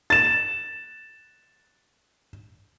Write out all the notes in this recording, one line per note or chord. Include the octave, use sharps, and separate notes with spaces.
A6 E7